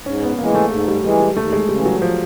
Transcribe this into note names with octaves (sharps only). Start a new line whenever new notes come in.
G#2 C#4
B3
E3 G#3 A#3
A3
G#2 G#3
G3
E3 G3 G#3
G3
D#2 A3
G#3
C#3 G3
E3
F#3
F3